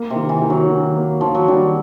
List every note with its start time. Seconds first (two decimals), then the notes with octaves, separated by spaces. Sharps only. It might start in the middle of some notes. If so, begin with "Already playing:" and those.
Already playing: A#3
0.10 C3
0.16 D#3
0.29 E3
0.42 D#3
0.50 F#3
0.69 D#3
0.95 A#3
1.21 D#3 F3
1.35 F#3
1.48 D#3 G3